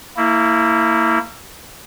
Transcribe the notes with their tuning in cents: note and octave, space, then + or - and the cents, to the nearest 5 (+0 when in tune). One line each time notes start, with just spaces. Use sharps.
A#3 -25 E4 -5